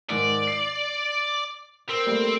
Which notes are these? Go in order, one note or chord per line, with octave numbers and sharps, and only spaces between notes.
G#2 D#3 D5
C7
C4 A#4
G3 A3 A#3